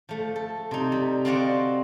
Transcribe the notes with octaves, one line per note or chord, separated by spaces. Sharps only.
F3 A3
A4
C3 D#4
G3
C4 F4 F#4 D5 D#5 F#5